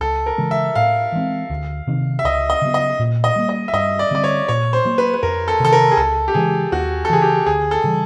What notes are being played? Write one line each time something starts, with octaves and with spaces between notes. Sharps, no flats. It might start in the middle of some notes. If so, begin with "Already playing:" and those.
C#2 A4
A#4
C#3 E3 G#3
E5
A2 F5
E3 G#3 C4
D2
C3 D#3
E5
C#2 D#5
D#5
C#3 F#3 B3
D#5
A#2
D#5
G3 A#3
D#5
E5
G2 D#5
D5
D3 G3 C4 D5
C#5
A#2 C#5
C5
F#3 A#3
B4
B4
F2 A#4
A4
C3 D#3 A4
A#4
G#4
C#2 A4
G4
C#3 E3 G#3 G#4
D#2 F#4
A4
C#3 E3 G#4
G4
D2 G#4
A4
C#3 E3 G3